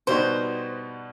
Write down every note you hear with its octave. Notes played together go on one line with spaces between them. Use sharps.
B2 G3 B3 D#4 F#4 C5